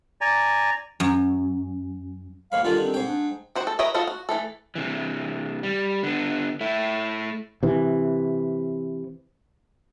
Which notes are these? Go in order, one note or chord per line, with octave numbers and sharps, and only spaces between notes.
D5 G#5 A#5
F#2
D#2 G#2 F5 B5
D3 D#3 G3 F4
C4
G#2 G5
D4
D#3 F#4 C5
A4
A#4 B4 C#5 D#5 E5
F4 F#4 A4 D#5 F5
F#4
E3 A3 A4
C3 E3
G3
D3 B3
A3 E4
C3 E3